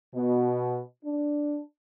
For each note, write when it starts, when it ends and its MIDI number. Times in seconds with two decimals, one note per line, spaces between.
0.15 0.79 47
1.05 1.60 62